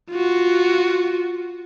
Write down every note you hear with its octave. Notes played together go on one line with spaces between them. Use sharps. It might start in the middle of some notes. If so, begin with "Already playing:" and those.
F4 F#4